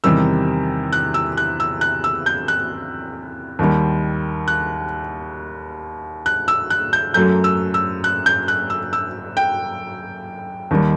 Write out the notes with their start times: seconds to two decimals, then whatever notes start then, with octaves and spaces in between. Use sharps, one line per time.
0.04 E2 C3 D#3 G3 E6
0.93 F#6
1.14 E6
1.37 F#6
1.60 E6
1.81 F#6
2.04 E6
2.26 G6
2.48 F#6
3.59 D#2 D#3 G3
4.48 F#6
6.26 F#6
6.48 E6
6.70 F#6
6.93 G6
7.14 F#2 F#3 A3 G6
7.44 E6
7.74 E6
8.04 F#6
8.26 G6
8.48 F#6
8.70 E6
8.93 E6
9.37 G5
10.71 D#2 D#3 G3